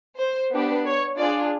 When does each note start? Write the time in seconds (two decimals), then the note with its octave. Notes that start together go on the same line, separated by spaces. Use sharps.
0.18 C5
0.52 B3 D4 G4
0.85 C#5
1.18 D4 F4 G#4 D5